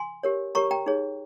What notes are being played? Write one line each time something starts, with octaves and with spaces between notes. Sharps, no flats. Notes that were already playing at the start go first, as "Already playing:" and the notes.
Already playing: G#5 C6
G4 A#4 C#5
G4 A#4 C#5 A#5 C#6
G5 A#5
D#4 G#4 C#5